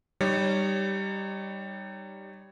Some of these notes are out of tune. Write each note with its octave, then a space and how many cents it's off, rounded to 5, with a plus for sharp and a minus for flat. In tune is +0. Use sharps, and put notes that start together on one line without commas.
G3 -5 D#4 -25 C#5 +0